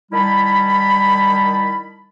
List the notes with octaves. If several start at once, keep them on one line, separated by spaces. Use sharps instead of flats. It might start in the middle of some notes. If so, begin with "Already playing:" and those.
D#3 G3 E4 A5 B5